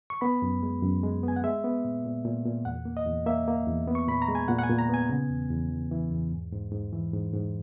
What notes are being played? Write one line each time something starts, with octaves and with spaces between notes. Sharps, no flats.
C#6
B3 B5
F#2
G#3
F#2
G#3
B3 G#5
F#5
G#3 E5
B3
A#2
A#2
A#2
A#2
E2 F#5
A#3
D#5
E2
A#3 E5
A#3
E2
B3
C#6
A#2 B5
A#5
G#3
G#5
A#2 F#5
F#5
G#5
A#2
A#5
B3 G#5
C#3
E2
E2
E3
E3
E2
G#2
G#2
G#2
E3
G#2
G#2